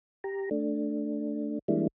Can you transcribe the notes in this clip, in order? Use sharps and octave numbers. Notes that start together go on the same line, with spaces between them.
G4 A#5
A3 D4
E3 G3 G#3 A#3 D4 E4